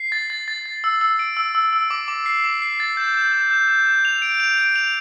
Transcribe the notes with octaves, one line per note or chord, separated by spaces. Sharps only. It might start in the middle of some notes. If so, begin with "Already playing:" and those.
Already playing: C7
A6
A6
A6
A6
E6
E6
D7
E6
E6
E6
D6
D6
C7
D6
C7
A6
G6
G6
G6
G6
G6
G6
F7
D7
F7
D7
F7